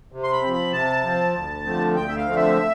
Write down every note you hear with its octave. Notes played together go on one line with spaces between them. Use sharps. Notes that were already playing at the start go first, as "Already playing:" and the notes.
C3
C6
B5
F3 C4
B5
C3 A5
F3 C4
D2
D3 F3 A3 C4
D2 G5
E5
F5
D3 F3 A3 C4
E5